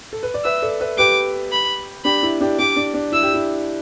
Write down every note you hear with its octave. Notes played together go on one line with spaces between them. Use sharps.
A4
B4
D5
B4 E5 E6
A4 D5
B4 E5
G4 B4 D6
B5
D4 G4 B5
E4
D4 G4
D4 G4 D6
D4
D4
E4 E6
G4
E4